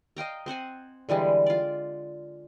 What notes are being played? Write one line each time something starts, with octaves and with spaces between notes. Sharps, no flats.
D#5 F5 G5 A#5
C4 C5 F#5 G#5
D3 E3 G3 G#3
F4 D5